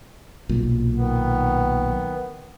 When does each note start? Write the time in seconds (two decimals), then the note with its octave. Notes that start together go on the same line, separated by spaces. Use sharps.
0.49 B1 A#2
0.97 D#3 B3